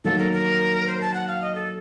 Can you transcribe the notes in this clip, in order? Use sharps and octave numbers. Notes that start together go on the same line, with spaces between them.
D#3 F#3 A#3 A4
A#4
A#4
C5
A5
F#5
F5
D#5
A4